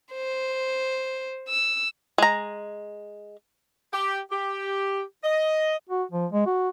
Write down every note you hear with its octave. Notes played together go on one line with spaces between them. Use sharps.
C5
E6
G#3 A#5
G4
G4
D#5
F#4
F3
G#3
F#4